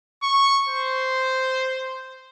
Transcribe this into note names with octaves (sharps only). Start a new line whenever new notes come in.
C#6
C5